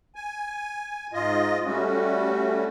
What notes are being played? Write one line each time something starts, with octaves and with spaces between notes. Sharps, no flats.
G#5
G#2 F4 D#5
G3 A3 C#4 F#4